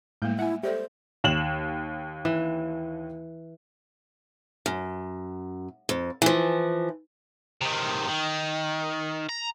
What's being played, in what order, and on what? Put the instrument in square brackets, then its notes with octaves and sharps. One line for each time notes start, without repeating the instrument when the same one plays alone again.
[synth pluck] A2 G6 [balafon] G3 G#3 A#3
[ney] E4 [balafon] E5 [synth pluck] F#5 G#5
[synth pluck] G4 [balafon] A4 D5 E5 [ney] C5
[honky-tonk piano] D#2 E7 F#7
[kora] E3
[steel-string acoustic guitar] F#2
F2
E3 F3
[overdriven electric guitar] C3 D#3
D#3
A#5